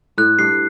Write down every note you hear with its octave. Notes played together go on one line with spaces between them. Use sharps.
A2 F#6
G2 C7